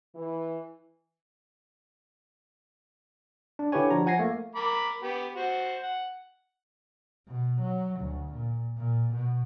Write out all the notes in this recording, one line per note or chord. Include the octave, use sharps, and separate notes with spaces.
E3
D4
D3 E4 G4 B4 C#5 G#5
F3 D4 F#4 A#5
F3 F#5 G#5 G#6 A#6 C7
A3 A#3
A#4 B5 D6
B3 G4
F#4 C5
F#5
B2
F#3
D2
A#2
A#2
B2